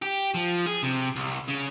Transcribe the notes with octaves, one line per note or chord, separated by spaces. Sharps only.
G4
F3
G#4
C3
C2
C#3